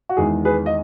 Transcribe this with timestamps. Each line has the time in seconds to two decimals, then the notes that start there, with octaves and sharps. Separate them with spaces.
0.09 F#4
0.17 E2 D#3 G#3 G#4
0.45 G#4 B4
0.66 D#5